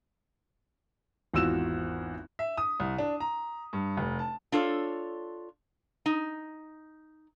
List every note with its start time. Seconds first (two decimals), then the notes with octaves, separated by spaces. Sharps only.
1.34 G#1 E2 F4 F#4 E6 E7
2.39 E5
2.57 D#6
2.80 C2
2.98 D4
3.20 A#5
3.73 G2
3.97 F1
4.19 A5
4.52 D4 F4 A4 C#5
6.06 D#4